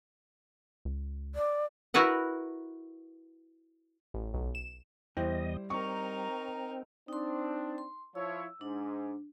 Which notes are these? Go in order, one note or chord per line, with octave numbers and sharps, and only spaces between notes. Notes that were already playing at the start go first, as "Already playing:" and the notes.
C#2
D5
E4 F#4 A#4 B4 F#5
A1
B1
E7
E2 G3 E4 C5 D#5 G5
C4 D#4 A#4 C#6
C4 D4 D#4 C6
C6
F3 E4 C#5 E6
G#2 D4